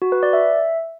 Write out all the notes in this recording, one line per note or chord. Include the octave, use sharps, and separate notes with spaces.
F#4
B4
D5
E5